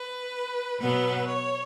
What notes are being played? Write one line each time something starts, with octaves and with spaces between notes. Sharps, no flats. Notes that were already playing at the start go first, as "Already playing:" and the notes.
Already playing: B4
B2 F#3 B3 B4
C#5